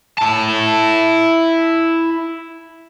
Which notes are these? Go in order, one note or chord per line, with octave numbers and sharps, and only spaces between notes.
E4 A5